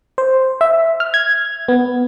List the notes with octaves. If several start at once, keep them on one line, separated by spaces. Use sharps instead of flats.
C5
E5
F6
G#6
B3